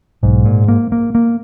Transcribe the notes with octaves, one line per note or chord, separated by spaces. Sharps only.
B1 G#2
A#2
A#3
A#3
A#3